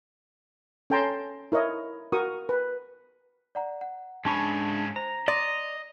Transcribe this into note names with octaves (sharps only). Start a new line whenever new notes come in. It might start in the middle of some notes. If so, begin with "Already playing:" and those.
C#4 A4 G5 A5 A#5 C6
E4 A#4 C#5 D#5
F#4 A#4 C#6 D#6
B4
D5 F#5 A#5
F#5
G#2 G#3 C#4 D4 A5 B5 C#6
C5 A#5
D5 D#5 C6